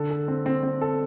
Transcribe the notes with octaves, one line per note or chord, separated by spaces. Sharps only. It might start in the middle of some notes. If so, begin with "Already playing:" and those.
Already playing: D3 A4
A4
C4
C4
C4
A4